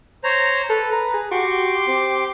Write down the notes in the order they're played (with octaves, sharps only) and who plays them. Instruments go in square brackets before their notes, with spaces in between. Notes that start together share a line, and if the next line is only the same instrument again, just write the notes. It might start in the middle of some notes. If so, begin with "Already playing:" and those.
[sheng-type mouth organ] C5 C#5 A#5
[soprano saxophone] A4 [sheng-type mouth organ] B4
[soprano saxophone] A#5
G#4
[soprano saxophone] F#4 [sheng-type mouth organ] G4 C6 D6
[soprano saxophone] C4